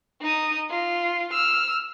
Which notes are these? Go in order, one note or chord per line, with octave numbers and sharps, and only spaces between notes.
D#4 D#6
F4
E6 F6